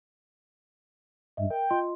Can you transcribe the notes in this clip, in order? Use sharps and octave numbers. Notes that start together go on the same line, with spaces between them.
G2 D#5 E5
A#4 G5
F4 D#5 C6